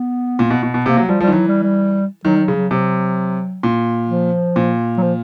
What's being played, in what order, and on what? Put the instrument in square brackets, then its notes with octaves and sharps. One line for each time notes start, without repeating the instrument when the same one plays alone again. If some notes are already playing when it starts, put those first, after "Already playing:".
Already playing: [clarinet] B3
[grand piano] A#2
B2
B2
B2
[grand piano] C3 [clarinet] A#3
[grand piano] F#3
[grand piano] F3 [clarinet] G3
[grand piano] F3 [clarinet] G3
[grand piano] D#3
[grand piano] E3 [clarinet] F#3
[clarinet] G3
G3
[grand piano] D#3 [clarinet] F#3
[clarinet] G3
F#3
[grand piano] C#3
[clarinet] F#3
[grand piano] C3 [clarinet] F#3
[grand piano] A#2
[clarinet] F3
[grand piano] A#2
[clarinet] F#3
F3